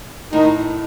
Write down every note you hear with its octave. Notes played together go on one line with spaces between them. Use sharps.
A2 D#3 D#4